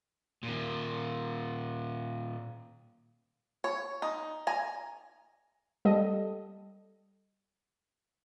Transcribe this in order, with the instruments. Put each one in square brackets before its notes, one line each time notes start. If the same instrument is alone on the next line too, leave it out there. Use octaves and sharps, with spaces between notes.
[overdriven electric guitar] A#2 D#3
[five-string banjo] C#5
D#4
G#5 A#5
[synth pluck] G3 A4 D#5